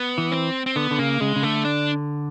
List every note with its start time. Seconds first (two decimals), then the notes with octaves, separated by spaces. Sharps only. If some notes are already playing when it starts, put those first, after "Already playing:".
Already playing: B3
0.18 E3
0.32 C4
0.66 C4
0.76 D3 B3
0.91 D3
0.99 C#3 A#3
1.20 C#3 G#3
1.36 C#3
1.43 D3 A3
1.65 D4